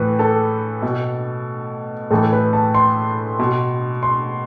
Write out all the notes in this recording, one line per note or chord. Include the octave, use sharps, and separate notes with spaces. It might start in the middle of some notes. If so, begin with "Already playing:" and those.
Already playing: A2 E3 B4
A4
B2
A2 E3 A4
B4
A5
C6
B2
C6